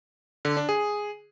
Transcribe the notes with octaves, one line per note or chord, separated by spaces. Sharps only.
D3
D4
G#4